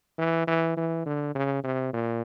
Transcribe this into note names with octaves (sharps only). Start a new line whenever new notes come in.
E3
E3
E3
D3
C#3
C3
A#2